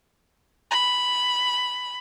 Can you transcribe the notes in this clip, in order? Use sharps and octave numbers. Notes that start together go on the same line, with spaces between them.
B5